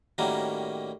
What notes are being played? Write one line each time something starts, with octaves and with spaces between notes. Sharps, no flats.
A2 D#3 G3 A#3 C#4 F#4